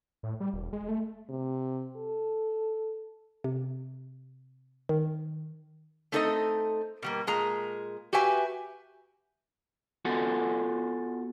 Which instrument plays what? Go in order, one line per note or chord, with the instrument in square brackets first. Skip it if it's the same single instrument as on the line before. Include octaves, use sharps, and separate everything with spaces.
[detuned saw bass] A2
G3
E1
G#3
A3
[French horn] C3
A4
[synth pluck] C3
D#3
[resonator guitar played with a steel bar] A3 C4 D#4 A4 C5 D#5
B2 G3 A#3
A#2 G#3 A#5
F#4 G4 B4 E5 G#5
[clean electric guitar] B3 F4 F#4 A4 F#5 G#5